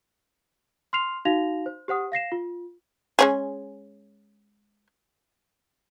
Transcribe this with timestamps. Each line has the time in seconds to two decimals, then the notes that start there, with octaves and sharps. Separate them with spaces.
0.93 C6 F6 C7 F7
1.25 D#4 F#4 F5 A#6 F7
1.66 C5
1.88 G4 C5 F#5 D#6
2.12 F5 A#6 C7 E7
2.32 F4
3.19 G#3 C#4 G#4